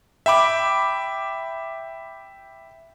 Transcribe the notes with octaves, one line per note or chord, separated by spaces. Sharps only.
E5 G5 B5 D6